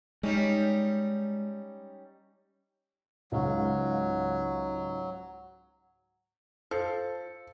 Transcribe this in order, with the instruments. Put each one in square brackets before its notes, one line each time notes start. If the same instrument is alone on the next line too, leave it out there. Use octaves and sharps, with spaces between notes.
[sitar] G3 C#4 D#4 [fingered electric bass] G#3
[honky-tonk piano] C#2 G#2 F5 [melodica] F#3
[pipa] F3 [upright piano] A4